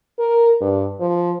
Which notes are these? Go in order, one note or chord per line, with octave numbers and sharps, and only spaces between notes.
A#4
G2
F3